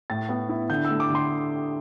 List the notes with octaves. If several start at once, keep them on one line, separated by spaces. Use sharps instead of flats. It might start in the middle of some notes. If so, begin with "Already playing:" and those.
A2 A6
B3
E4
D3 G6
E6
A3
D6
D3
C6